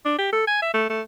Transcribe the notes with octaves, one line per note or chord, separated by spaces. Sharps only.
D4
G4
A4
G#5
E5
A3
A3